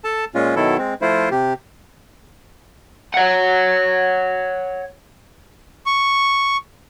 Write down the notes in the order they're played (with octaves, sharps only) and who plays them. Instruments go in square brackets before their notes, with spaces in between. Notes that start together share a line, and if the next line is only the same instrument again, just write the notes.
[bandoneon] A4 A5
A#2 G#3 C#4 F4
B2 D#3 F#3 B3 E4 A4
G#3 C4
F3 A3 E4 F4 C5
C3 G4
[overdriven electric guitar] C#5 F#5
[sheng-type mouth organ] C#6